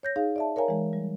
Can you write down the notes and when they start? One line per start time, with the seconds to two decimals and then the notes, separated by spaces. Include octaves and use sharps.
0.03 C#5 G6 A#6
0.16 D#4 G#4 F5
0.36 D5 E5 A5
0.56 A#4 C#5 F5 G#5 A#5
0.68 E3 G#3
0.93 G3